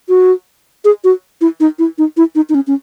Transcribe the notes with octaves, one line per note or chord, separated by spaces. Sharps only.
F#4
G#4
F#4
E4
D#4
E4
D#4
E4
D#4
D#4
C#4
C#4